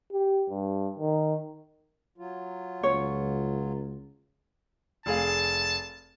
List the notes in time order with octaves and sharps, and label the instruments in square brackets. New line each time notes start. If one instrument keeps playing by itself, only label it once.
[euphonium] G4
G2
D#3
[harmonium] F#3 F4
[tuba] C#2 [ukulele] C#5
[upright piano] F1 G#4 F5 [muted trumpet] A5